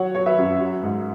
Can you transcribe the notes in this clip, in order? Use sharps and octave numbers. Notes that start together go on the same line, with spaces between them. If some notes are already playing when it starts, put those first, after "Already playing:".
Already playing: F#3 C#5 F#5
F#3 C#5
B4 E5
F#2
F#3
G#2